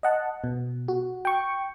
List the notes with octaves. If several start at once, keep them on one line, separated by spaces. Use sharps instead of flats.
D#5 F#5 A5
B2
F#4
G5 C#6